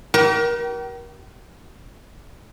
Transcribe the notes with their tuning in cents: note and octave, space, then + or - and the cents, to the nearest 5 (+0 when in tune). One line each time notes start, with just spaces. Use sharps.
G4 -40 A#4 +30